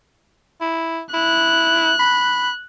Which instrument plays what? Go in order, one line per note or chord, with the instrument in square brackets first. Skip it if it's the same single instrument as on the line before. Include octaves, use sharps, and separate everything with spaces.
[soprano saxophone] E4
[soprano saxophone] E4 [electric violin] F#6
[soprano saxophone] B5